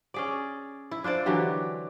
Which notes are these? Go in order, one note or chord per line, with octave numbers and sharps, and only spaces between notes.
C#4 G#4 D5
E4
D4 F4 C5 D5
D3 E3 F#3 G4